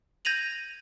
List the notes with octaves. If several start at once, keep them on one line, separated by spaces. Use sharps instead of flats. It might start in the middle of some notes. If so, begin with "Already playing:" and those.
G6 G#6 A#6 D#7 F7 F#7